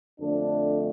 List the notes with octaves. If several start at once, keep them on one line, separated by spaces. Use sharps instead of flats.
F2 D3 A3 D4